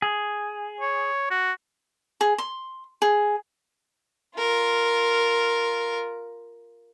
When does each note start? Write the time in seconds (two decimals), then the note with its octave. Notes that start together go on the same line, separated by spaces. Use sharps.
0.02 G#4
0.81 C#5
1.30 F#4
2.21 G#4
2.38 C6
3.02 G#4
4.37 F4 A#4